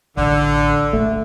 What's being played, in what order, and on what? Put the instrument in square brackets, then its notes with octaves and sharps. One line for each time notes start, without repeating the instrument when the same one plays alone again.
[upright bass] A1 [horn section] D3
[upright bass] A2 [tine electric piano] A3